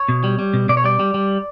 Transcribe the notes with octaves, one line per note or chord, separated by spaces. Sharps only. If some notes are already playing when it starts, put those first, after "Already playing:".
Already playing: C#5
B2
G3
G3
B2
B2 D5
C#5
G3 D5
G3
G3